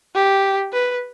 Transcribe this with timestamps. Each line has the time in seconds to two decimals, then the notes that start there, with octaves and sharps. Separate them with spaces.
0.15 G4
0.73 B4